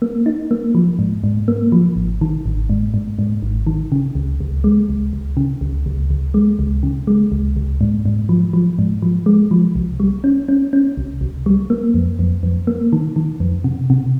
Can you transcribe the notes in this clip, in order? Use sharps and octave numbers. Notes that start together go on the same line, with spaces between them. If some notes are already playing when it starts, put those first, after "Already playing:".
A#3
D#4
A#3
F3
G#2
G#2
A#3
F3
G#1
D#3
G#1
G#2
G#2
G#2
G#1
D#3
C#3
C#2
C#2
G#3
C#2
C#2
C#3
C#2
C#2
C#2
G#3
C#2
C#3
G#3
C#2
C#2
G#2
G#2
F3
F3
G#2
F3
G#3
F3
C2
G3
C#4
C#4
C#4
C2
C2
G3
A#3
F2
F2
F2
A#3
D#3
D#3
F2
C3
C3